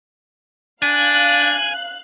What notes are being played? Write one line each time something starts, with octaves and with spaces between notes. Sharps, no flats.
D4 F5 G#5 F#6